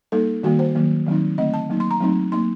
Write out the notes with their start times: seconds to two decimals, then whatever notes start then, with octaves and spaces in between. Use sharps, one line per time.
0.12 G3 A#3 D#4 A4
0.43 D#3 G3 A#3 F#4
0.59 C5
0.75 D#3 F#3 A#3
1.07 D#3 F#3 C4 D#4
1.38 D3 A3 C4 D#5
1.54 A5
1.70 F#3 A#3 D#4
1.80 C6
1.91 A#5
2.00 F#3 A3 C4 D#4
2.32 F#3 A#3 D#4 C6